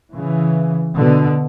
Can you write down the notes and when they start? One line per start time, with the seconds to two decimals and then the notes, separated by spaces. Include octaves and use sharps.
0.15 C#3 E3
0.97 B2 D3